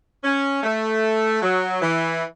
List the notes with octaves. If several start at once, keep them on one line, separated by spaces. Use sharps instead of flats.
C#4
A3
F#3
E3